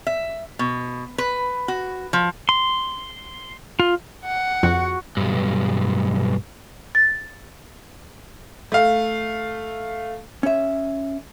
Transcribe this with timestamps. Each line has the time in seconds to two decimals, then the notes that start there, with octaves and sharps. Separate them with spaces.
0.07 E5
0.59 B2
1.18 B4
1.68 F#4
2.13 F3
2.49 C6
3.80 F4
4.26 F#5
4.63 F2 F#4
5.17 B1 G2
6.95 A6
8.72 A3 F5
10.43 C#4 E5